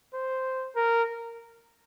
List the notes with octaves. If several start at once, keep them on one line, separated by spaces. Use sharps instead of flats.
C5
A#4